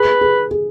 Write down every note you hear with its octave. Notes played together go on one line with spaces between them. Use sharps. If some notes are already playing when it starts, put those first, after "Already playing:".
Already playing: G#4 B4
G#4
G#4